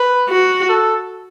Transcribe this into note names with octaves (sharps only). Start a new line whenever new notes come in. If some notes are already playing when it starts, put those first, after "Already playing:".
Already playing: B4
F#4
A4